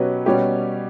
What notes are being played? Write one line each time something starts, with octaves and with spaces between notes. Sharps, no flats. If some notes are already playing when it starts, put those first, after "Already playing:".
Already playing: B2 F#3 C#4 G4 B4
B2 G3 C#4 G4